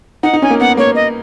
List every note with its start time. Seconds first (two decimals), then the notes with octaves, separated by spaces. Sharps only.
0.23 D#4 F#5
0.33 D#4
0.42 C#4 G#5
0.50 A#3
0.60 B3 F#5
0.77 A#3 C#5
0.95 D#5